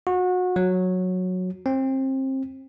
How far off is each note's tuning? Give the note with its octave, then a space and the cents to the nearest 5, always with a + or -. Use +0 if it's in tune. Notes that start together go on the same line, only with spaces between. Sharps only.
F#4 -30
F#3 -10
C4 +30